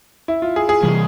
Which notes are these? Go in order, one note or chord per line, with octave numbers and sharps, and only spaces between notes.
E4
F4
G#4
G#4
C3 E3 G3